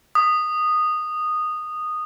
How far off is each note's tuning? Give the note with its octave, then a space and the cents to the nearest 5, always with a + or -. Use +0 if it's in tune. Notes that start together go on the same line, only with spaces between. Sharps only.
D#6 -10